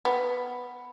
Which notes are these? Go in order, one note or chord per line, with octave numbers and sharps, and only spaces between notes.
B3